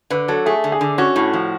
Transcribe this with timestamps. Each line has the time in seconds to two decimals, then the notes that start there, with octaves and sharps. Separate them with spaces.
0.10 D3 B4
0.28 F#3 A4
0.46 A3 G#4
0.64 D3
0.72 G#4
0.81 D3
0.98 C#4 F#4
1.16 A2
1.33 F3